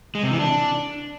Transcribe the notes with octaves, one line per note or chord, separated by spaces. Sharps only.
G#3
C3
E3
D4